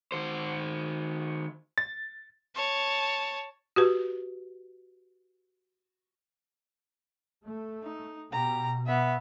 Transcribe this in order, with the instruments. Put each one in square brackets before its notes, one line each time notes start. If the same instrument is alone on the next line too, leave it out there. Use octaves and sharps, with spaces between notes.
[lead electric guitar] D#3 C5
[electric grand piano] A6
[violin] C#5 A5
[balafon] F#4 G4 B4
[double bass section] A3
[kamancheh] D#4
[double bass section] B2 [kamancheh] G4 A#5
[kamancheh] B3 E5